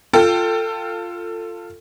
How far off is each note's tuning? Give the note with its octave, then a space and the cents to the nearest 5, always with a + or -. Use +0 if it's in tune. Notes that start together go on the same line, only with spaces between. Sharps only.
F4 +0 A4 +20 G5 +0